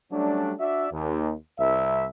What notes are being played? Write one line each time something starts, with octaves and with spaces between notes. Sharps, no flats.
F#3 G3 A3 C#4 D4
D4 F#4 D5 E5
D#2
C2 E5